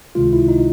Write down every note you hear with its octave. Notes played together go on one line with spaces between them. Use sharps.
C#2 C3 D#3 G#3 F4
E4
D#4